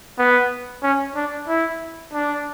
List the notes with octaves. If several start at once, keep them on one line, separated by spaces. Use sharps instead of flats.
B3
C#4
D4
E4
D4